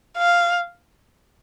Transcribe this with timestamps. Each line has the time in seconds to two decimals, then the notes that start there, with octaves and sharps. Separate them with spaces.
0.18 F5